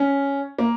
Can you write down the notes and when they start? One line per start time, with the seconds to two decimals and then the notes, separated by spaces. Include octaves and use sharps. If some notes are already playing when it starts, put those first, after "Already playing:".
Already playing: C#4
0.59 A#3